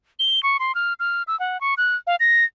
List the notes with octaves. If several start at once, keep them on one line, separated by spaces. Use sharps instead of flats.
G7
C#6
C6
F6
F6
E6
F#5
C#6
F#6
F5
A#6